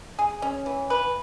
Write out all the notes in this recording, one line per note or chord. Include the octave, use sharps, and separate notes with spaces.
G#4
C#4
E3
B4